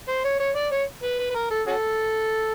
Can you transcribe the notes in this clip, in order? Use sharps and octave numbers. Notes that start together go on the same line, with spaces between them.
C5
C#5
C#5
D5
C#5
B4
B4
B4
A#4
A4
C#4 F#4 A4